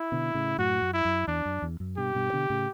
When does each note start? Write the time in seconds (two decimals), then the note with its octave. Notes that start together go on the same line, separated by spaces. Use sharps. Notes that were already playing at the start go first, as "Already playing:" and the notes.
Already playing: E4
0.12 B2 D3
0.35 A2 C#3
0.58 F#2 A2 F#4
0.82 F#2
0.94 E4
1.05 F#2
1.28 E2 D4
1.45 F#2
1.62 E2
1.80 F#2
1.97 G2 B2 G4
2.15 G2 B2
2.33 B2 D3
2.50 A2 C#3